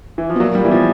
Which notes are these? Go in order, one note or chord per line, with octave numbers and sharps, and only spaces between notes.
E3
F3
B2
A#2 F#3
G3
E3
B2 F3